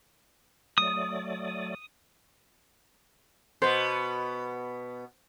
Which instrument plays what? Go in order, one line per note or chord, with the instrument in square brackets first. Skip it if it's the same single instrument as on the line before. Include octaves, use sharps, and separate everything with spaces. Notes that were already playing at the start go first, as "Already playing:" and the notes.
[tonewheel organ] F#3 A3 D5 [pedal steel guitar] D#6
[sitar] B2 B3 [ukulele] C5